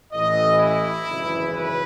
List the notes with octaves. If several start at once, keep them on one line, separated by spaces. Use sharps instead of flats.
A1 A2 E3 D#5
E4
G#1 F#2 C#3 E3
B4